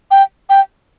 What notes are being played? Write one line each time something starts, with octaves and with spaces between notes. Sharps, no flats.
G5
G5